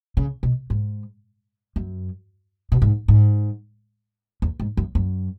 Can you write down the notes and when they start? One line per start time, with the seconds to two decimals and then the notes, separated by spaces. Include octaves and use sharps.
0.17 C#3
0.43 B2
0.70 G#2
1.76 F#2
2.72 B2
2.82 G#2
3.08 G#2
4.42 E2
4.60 G#2
4.77 F#2
4.95 F#2